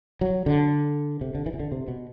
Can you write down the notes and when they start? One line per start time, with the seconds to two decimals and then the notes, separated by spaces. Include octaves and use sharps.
0.21 F#3
0.46 D3
1.21 C3
1.35 D3
1.46 E3
1.53 C3
1.60 D3
1.72 C3
1.88 B2